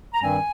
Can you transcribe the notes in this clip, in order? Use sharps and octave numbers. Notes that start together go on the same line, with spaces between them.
A#5
G2 D#3 G3 C4 G#5